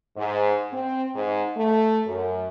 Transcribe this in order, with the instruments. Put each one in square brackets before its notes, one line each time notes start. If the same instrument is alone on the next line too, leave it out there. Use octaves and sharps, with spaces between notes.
[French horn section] G#2
C4
G#2
A3
F#2